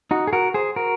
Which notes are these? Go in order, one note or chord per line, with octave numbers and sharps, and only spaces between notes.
D#4 F#4
G#4
F#4 A#4
G#4 C5
F#4 A#4